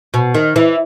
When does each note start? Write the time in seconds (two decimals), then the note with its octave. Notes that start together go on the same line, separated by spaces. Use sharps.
0.14 B2
0.35 D#3
0.56 E3